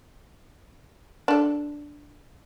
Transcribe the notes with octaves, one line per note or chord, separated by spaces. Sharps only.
D4 A4